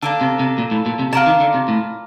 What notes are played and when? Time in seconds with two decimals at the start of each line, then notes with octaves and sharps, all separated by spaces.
0.02 D3 A#3 D4 A4
0.21 C3
0.39 C3
0.58 A#2
0.71 A2
0.86 A#2
0.99 C3
1.13 C3 F4 A#4 D5 A5
1.26 D#3
1.40 D3
1.54 C3
1.68 A2